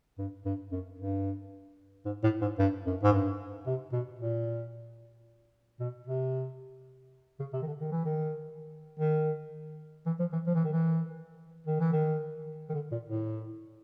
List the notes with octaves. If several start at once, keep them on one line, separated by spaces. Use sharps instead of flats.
G2
G2
F#2
G2
G#2
A2
G#2
G2
F#2
G#2
G2
C3
B2
A#2
B2
C3
C#3
C3
D#3
D3
D#3
E3
D#3
D#3
E3
F3
E3
F3
E3
D#3
E3
D#3
E3
D#3
D#3
D3
A#2
A2